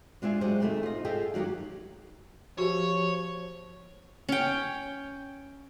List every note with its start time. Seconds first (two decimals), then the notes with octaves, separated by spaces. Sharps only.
0.22 G#3 D4 F4 E5 G#5
0.41 F#3 G#3 G4 C5
0.60 C3 D#3 E3 A3 E4 G#4
0.83 F4 D#5
1.05 F4 G#4 A4 D#5 E5 G5
1.34 D#3 F#3 A3 A#3 G4
2.58 F3 F#4 G4 C#5
4.29 C#4 G5